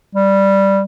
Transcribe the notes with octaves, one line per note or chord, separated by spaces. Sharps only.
G3